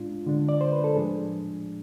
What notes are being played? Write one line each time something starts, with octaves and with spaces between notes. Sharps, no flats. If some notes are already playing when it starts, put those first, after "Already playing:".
Already playing: A2 G#3 D4 F4
D3 G#3 D4
D5
C5
B4
A4
A2 F3 G#3 D4 G#4